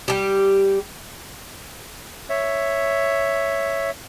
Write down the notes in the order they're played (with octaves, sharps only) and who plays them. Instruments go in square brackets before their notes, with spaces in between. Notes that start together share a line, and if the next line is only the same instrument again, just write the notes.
[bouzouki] G3 G4
[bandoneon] C#5 E5